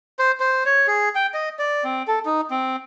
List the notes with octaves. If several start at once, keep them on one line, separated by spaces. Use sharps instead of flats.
C5
C5
C#5
G#4
G5
D#5
D5
C4
A4
D#4
C4